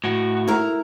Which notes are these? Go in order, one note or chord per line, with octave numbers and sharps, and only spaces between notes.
A2 F#4
E4 A#4